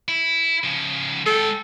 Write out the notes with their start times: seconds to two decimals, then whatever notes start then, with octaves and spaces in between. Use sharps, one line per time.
0.08 E4
0.64 C#3 F3
1.26 G#3 A4 G5